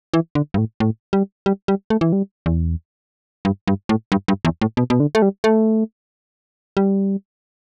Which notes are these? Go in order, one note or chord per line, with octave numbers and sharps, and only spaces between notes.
E3
D3
G2
A2
A2
G3
G3
G3
A3
E3
G3
E2
G2
G2
A2
G2
G2
E2
A2
B2
B2
D3
A3
G3
A3
G3